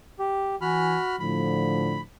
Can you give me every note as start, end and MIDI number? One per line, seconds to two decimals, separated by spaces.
0.19 0.56 67
0.61 0.97 52
0.61 1.16 66
0.61 0.97 80
0.61 1.16 83
0.61 1.16 89
1.20 2.00 45
1.20 2.00 50
1.20 2.00 53
1.20 2.01 83